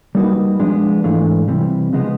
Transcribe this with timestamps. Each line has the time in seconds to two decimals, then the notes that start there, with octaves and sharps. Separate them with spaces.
0.15 G3 A#3 D#4 F#4 B4
0.60 F3 G#3 B3 D4
1.04 G#2 E3 A3 D4 F4
1.48 C3 E3 G3
1.93 C#3 F3 G#3 B3